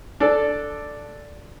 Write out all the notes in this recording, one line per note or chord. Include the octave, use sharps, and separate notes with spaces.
D4 A4